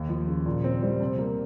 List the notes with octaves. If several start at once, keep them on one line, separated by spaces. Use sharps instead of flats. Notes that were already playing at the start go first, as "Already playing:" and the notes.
Already playing: D#2
F3
C#3
A#2
C4
G3
C3
A#3